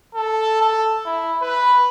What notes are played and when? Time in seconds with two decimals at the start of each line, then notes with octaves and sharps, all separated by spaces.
0.15 A4
0.61 A4
1.05 E4
1.42 B4